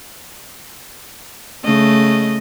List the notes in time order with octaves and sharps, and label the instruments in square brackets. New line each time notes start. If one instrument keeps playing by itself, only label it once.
[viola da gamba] C#3 A3 D#5